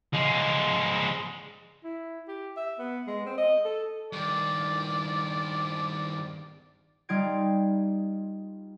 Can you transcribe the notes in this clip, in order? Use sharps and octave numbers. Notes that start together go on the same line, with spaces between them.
F3 G#3
E4
G4
E5
B3
G#3
C4
D#5
A4
G2 D#3 D5
G3 D#4 F4 C6 G#6 D7